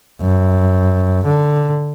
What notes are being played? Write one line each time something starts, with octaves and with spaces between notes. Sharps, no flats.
F#2
D3